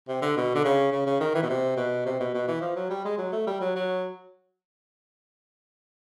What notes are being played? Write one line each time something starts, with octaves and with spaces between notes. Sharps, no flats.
C3
D3
B2
D3
C#3
C#3
C#3
D#3
E3
B2
C3
B2
C3
B2
B2
E3
F3
F#3
G3
G#3
F#3
A3
G3
F#3
F#3